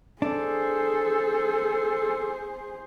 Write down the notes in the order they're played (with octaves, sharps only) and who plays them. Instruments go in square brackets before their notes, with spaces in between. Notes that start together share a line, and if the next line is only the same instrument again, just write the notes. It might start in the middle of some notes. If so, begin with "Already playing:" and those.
[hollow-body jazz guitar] D4 [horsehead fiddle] G#4 C5 [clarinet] A4